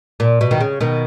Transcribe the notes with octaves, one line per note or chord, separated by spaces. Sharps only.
A#2
B2
D#3
C#3
B2 D#3